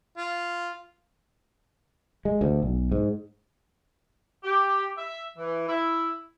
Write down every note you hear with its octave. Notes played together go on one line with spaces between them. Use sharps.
F4
G#3
D2
B1
G#2
G4
E5
E3
E4